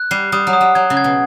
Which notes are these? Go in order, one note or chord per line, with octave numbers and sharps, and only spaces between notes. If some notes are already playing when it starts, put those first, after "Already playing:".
Already playing: F#6
G3 C7
G3 D#6
F#3
D#6
G3
F#3 G#6
C#3
G#6
B2